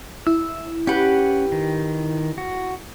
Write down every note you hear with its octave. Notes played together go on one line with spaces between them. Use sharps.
E4 E6
C#4 G4 B4 F#5
D#3
F#4